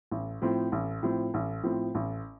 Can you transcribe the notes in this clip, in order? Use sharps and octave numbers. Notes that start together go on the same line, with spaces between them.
A1
A2 F3 C4
A1
A2 F3 C4
A1
A2 F3 C4
A1